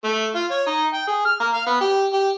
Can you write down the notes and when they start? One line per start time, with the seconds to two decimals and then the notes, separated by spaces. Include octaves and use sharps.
0.04 A3
0.35 F4
0.51 C#5
0.67 D#4
0.94 G5
1.07 G#4
1.25 F6
1.40 A#3
1.54 F5
1.67 B3
1.81 G4
2.13 G4